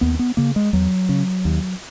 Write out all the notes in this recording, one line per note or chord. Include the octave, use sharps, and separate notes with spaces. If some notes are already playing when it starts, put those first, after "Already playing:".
D#2 B3
B3
C#3 A#3
G#3
E2 F#3
C#3
D#2